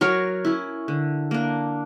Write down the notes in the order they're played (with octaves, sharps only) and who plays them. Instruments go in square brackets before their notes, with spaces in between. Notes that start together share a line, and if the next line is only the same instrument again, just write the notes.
[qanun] F#3 A#4 C#5
C#4 E4
D3
A#3 D4